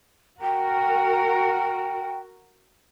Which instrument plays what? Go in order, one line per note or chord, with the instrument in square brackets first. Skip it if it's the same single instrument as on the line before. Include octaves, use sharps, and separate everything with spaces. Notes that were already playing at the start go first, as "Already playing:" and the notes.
[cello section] F#4 A#4 [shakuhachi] G5